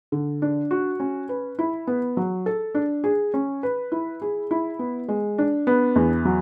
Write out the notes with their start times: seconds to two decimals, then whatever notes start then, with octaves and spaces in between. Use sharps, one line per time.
0.12 D3
0.42 D4
0.71 F#4
1.00 C#4
1.29 B4
1.59 E4
1.87 B3
2.17 F#3
2.46 A4
2.75 D4
3.04 G#4
3.34 C#4
3.63 B4
3.92 E4
4.22 G#4
4.51 E4
4.79 B3
5.08 G#3
5.38 D4
5.67 B3
5.96 E2
6.25 F#3